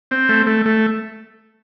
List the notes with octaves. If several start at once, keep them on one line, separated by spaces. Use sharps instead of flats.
C4
A3
A3
A3